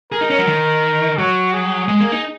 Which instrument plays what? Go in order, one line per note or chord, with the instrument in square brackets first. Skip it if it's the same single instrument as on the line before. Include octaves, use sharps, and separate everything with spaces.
[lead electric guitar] G#4 [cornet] A#4
[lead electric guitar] D#4
C#4
F#3
D#3
[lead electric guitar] F#3 [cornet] F#4
[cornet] G#4
[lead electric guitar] G#3
A#3
D#4